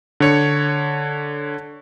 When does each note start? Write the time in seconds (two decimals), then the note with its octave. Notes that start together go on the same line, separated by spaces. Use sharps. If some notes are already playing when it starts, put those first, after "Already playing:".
0.20 D3 C#5 C#7